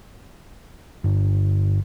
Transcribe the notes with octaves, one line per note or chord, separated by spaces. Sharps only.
G1